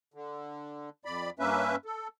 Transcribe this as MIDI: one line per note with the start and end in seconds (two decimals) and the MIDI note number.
0.14 0.90 50
1.05 1.30 41
1.05 1.30 74
1.05 1.30 83
1.39 1.76 43
1.39 1.76 58
1.39 1.76 61
1.39 1.76 71
1.39 1.76 76
1.85 2.08 69